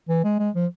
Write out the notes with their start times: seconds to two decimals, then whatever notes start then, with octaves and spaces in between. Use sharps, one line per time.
0.09 E3
0.24 G#3
0.39 G#3
0.55 F3